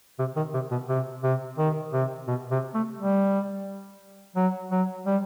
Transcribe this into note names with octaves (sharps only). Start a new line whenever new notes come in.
C3
D#3
C3
B2
C3
C3
D#3
C3
B2
C3
A3
G3
F#3
F#3
G3